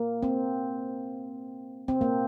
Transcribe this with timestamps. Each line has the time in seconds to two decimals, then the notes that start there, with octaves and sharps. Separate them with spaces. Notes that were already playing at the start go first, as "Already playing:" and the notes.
Already playing: A#3
0.23 C4
1.88 C4
2.01 A#3